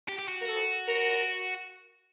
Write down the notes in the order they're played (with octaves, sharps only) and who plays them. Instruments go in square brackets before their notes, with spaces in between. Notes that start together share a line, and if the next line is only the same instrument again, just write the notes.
[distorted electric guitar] G4
G4
F#4
[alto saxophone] A#4
A4
A#4